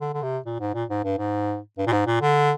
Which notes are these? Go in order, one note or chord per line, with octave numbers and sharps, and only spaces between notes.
D3
D3
C3
A#2
G#2
A#2
G#2
G2
G#2
G2
A#2
G#2
A#2
D3